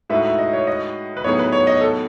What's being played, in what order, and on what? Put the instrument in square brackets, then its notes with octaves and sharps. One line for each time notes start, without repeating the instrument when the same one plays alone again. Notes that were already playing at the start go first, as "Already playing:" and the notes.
[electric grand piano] A2 G#3 D#4 F#4 B4 [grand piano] E5
[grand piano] E5
D#5
C#5
D#5
B4
[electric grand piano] A2 F#3 B3 D#4 G#4 [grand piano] C#5
[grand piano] B4
C#5
D#5
A4